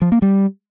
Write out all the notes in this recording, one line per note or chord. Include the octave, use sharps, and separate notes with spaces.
F3
A#3
G3